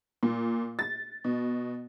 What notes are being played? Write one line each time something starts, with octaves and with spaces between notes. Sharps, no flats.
A#2
A6
B2